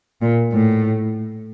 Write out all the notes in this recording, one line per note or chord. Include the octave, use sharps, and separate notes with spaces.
A#2
A2